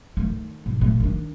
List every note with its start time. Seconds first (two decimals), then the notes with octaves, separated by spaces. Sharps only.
0.17 D#3 A3
0.66 G#2
0.80 A#2 A3
1.00 D#3 D4